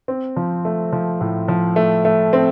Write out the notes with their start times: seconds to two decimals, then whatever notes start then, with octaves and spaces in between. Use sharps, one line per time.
0.08 C4
0.36 F3
0.65 A3
0.93 F3
1.21 A2
1.48 F3
1.76 A3
2.05 A3
2.33 C4